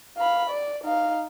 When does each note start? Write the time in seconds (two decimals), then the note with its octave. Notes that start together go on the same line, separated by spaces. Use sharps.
0.17 F5 B5
0.50 D5
0.84 D#4 F5